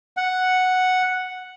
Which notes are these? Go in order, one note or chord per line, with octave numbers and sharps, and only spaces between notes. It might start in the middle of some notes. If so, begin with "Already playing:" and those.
F#5